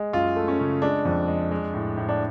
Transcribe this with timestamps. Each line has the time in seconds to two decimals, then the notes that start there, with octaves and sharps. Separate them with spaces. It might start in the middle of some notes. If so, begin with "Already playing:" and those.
Already playing: G#3
0.13 F#2 F4
0.36 A3
0.48 C#4
0.60 C#3
0.82 G#3 D4
1.05 F2
1.28 G#3
1.51 G#3
1.74 A2
1.97 A2
2.09 D4